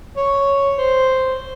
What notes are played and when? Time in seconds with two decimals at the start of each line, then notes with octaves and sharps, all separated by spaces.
0.17 C#5
0.78 C5